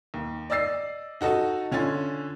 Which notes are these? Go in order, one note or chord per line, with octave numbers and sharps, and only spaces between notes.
D#2
D5 D#5 E6 A6 C7
D#4 F#4 A4 D#5 A5
D3 C#4 F4 G#5 A6